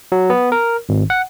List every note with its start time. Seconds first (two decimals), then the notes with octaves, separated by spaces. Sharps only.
0.12 F#3
0.30 B3
0.52 A#4
0.89 G#1
1.10 F#5